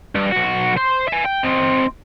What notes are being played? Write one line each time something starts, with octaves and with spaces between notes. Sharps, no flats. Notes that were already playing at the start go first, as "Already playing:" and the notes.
G2
B1 F#4
C5
E5 G#5
G5
C4 D#4